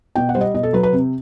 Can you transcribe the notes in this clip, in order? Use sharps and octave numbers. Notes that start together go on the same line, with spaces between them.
B2 G5
F#5
G3 C5
D#5
B2 D#5
A4
F#3 B4
B4
C3